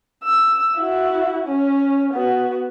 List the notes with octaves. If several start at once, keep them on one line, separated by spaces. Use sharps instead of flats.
E6
E4 F#4
C#4
B3 F#4